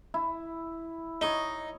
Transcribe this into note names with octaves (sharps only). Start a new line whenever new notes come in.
E4
D#4 C#5 D#5